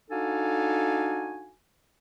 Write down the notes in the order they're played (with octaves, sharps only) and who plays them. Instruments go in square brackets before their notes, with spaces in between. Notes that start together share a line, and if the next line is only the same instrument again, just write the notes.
[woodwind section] D4 D#4 F#4 A4 F5 G#5